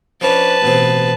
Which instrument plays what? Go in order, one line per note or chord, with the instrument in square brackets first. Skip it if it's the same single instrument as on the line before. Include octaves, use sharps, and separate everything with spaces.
[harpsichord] F3 C#4 D4 [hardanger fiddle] B4 A5
[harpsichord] A1 B2 C4